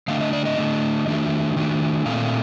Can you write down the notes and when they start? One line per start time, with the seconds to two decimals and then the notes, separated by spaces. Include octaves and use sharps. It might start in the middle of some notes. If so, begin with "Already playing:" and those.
0.08 D3 A3 D4 F5
0.20 D#5
0.33 D5
0.45 D#5
0.58 D3 A3 D4
1.07 D#3 A3 D4
1.56 D#3 A3 D4
2.05 A#2 A3 C4 F5